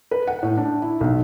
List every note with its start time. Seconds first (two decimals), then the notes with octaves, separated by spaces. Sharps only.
0.11 B4
0.27 F#5
0.43 A2
0.57 D4
0.82 E4
1.01 B1